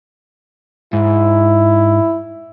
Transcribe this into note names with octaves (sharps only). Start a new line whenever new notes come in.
G#2 E4